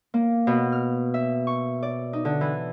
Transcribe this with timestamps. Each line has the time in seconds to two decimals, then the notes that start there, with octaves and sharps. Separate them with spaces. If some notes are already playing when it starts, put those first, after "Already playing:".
0.14 A#3
0.47 B2
0.72 F6
1.14 E5
1.47 C#6
1.83 D5
2.13 D#4
2.25 D3
2.41 E3